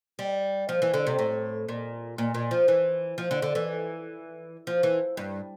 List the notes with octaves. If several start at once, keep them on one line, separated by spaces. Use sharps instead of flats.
G3
F3
E3
D3
C3
A2
A#2
A#2
A#2
F3
E3
F3
D3
D3
E3
F3
E3
G2